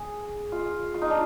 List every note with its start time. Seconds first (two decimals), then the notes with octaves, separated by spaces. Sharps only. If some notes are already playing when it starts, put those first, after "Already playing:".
Already playing: G#4
0.52 F4
0.94 F4
1.02 D#4
1.10 D4